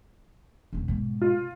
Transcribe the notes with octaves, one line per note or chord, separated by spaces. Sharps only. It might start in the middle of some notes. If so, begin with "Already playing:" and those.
E1 B1
G#2 B2
F4